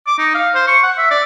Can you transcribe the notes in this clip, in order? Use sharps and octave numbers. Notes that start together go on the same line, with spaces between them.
D6
D#4
F5
C5
C#6
F#5
E5
D5